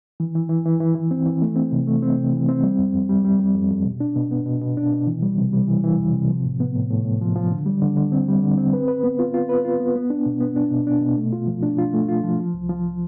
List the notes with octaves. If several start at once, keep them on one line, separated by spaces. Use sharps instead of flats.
E3
E3
E3
E3
E3
E3
C4
E3
A3
C4
C3
A3
C4
C3
E3
C4
G3
F2
F2
G3
G3
G3
F2
F2
B2
D4
B2
B3
B2
B2
D4
B2
E3
G3
C3
G3
E3
E3
F2
C3
F3
A2
B3
A2
A2
A2
F3
F3
D3
G3
D3
D3
C4
G3
D3
C4
B4
B4
B3
F4
F4
B4
F4
B3
B3
D4
B2
B3
D4
B2
D4
B2
A3
F4
F3
D4
F4
A3
F4
F3
F3
C2
F3